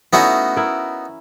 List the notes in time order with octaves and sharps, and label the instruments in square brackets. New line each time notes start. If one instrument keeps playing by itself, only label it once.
[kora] A3 C#4 E4 [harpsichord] B3 D#4 F#4
[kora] E4 A#4